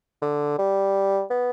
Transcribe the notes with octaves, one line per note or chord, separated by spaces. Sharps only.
D3
G3
B3